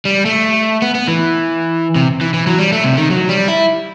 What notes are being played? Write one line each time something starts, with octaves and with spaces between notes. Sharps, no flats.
G3
A3
B3
B3
E3
C3
E3
E3
F#3
G3
A3
C3
D#3
F#3
G3
E4